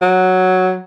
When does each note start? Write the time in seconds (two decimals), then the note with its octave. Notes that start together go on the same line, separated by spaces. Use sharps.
0.02 F#3